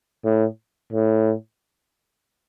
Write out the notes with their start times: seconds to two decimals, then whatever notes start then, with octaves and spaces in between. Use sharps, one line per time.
0.25 A2
0.93 A2